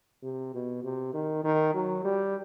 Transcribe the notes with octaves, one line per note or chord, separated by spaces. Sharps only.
C3
B2
C3
D#3
D#3
F#3
G3